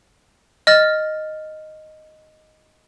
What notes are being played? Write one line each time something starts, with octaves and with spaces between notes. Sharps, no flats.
D#5 F6 A6